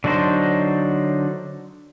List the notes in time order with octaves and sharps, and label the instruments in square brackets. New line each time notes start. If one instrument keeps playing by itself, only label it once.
[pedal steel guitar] D3 F#3 D4 D#4 C5